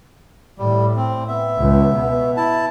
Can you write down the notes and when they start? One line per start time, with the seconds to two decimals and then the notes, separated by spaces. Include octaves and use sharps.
0.59 A2 G3
0.97 C4
1.28 B3 E5
1.57 C#2
1.93 B2
2.37 E4 A5